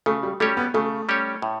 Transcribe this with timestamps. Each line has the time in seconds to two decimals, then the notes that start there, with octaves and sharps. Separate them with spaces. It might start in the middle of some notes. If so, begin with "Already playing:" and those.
0.06 C#3 A3
0.23 G3
0.40 G3 A3 C#4 G4 C#5
0.57 B3
0.74 C#3 A3
1.09 G3 C#4 G4 C#5
1.42 A2